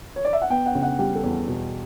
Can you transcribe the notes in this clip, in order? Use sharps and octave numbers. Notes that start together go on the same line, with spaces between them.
C#5
D5
E5
F#5
B3 G5
F#5
C#3
F#5
G3 G4
A4
E2
B2